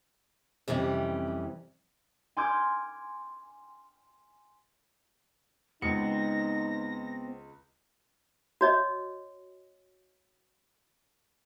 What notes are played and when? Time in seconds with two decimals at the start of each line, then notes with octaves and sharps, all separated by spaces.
0.68 F2 C3 E3 G3 C#4
2.37 G#5 C6 D6 F6 G6 G#6
5.82 C#2 B3 C4 D#4 A#6 C#7
8.61 F#4 C#5 D#5